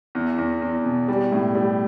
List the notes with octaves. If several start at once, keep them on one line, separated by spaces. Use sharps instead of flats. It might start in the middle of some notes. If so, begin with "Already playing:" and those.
E2
E2
E2
B2
G3
A2
G3